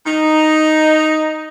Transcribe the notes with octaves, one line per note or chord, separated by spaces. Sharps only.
D#4